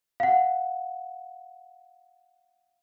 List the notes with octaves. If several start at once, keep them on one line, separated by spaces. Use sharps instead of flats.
F5 F#5